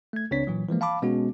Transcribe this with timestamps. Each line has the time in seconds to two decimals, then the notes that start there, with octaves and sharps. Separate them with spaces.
0.13 A3 G#6
0.31 C#2 C#3 C4 D4 C#5 B6
0.47 A#2 E3 F#3
0.69 E3 F3 G#3 A#3
0.81 F5 A5 B5 D6
1.02 B2 G#3 B3 C#4 F#4